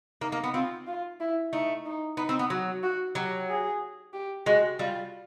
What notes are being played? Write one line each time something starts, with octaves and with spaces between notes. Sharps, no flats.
A#3 D#4
A#3
B3
C4 F4
F4
E4
A3 D#4
D#4
B3 D#4
C4
B3
F#3 F#4
F#4
F#3 G4
G#4
G4
G#3 F#4
G3 F4